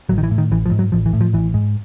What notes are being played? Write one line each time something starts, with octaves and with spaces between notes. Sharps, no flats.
A1 F#3
D#3
E3
A2
D#3
A1 E3
F3
G#2
F#3
A1 F3
E3
A2
F3
A1 E3
G#2